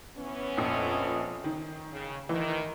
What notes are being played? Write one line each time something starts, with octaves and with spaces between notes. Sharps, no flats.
E3 B3 C#4
A#1 F2
D#3
C#3
D#3 E3